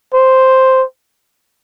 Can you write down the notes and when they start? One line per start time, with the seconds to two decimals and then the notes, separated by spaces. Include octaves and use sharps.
0.14 C5